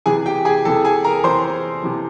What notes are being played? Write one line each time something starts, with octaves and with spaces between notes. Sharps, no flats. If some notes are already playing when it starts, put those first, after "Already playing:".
C3 E3 G#4 G#5
G4 G5
G#4 G#5
C3 E3 A4 A5
G#4 G#5
A#4 A#5
C3 E3 C5 C6
C3 E3